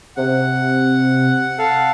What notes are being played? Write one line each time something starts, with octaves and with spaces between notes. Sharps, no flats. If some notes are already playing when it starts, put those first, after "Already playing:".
C3 F#5
A4 F5 F#5